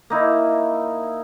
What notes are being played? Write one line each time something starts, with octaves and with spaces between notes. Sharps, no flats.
A#3 D#4 E4